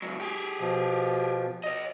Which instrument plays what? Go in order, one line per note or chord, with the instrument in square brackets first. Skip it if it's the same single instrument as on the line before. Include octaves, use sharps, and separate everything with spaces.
[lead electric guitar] C#2 F#3
G4 G#4
[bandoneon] B2 F3
[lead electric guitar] C#5 D#5